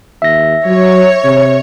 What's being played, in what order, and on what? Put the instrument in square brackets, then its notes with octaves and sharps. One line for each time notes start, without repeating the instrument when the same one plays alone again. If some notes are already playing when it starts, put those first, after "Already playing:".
[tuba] D#2 [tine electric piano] E5 A#6
[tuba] F#3 [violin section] C#5
[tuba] C3